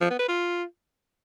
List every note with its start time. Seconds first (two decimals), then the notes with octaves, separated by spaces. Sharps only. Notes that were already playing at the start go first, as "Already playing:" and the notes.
0.01 F3
0.10 B3
0.19 B4
0.28 F4